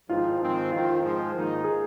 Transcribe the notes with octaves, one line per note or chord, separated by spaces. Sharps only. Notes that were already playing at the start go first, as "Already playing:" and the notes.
G#1 G#2 F3 C4 D#4 F4
G#2 D#3 G#3 C4
F2 D#3 C4 F4
F4
G#2 F3 G#3
G#2 D#3 A#3 D#4
G#4